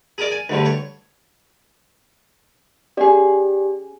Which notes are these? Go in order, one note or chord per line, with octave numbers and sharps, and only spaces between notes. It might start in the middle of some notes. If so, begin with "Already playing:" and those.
G#4 A#4 D5
G#5
D2 G2 D3
C#5
C#4 G4 G#4 D5